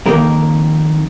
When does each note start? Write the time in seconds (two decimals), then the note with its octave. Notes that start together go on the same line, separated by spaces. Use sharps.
0.06 F2 D#3 A#3 A#4